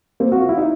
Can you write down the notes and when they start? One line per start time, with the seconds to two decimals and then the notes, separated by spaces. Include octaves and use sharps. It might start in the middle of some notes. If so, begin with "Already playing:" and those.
0.20 A#3 C4
0.32 F#4
0.40 F4
0.49 E4
0.57 D#4